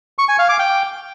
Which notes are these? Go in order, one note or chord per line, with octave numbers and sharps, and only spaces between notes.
C#6
G#5
F5
D6
G5